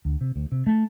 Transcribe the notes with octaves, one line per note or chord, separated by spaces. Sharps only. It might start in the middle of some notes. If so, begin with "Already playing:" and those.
D2
C3
D2
C3
A3